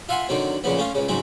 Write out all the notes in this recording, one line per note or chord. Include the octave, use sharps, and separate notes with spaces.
F4 E5 F#5 G#5 C6
D3 D#3 F#3 C4
A#2 C#3 F3 B3
A3 C#4 F4
C#2 C#3
G#2 C#3 F#3 G#3 C4